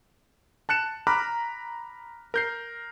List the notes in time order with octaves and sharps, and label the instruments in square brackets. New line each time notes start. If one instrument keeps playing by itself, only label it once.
[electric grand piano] A5 F#6 C#7 E7
A#5 B5 D6 F6 F#6
A#4 G6 C7